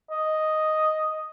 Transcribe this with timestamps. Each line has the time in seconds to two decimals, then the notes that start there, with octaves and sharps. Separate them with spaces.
0.11 D#5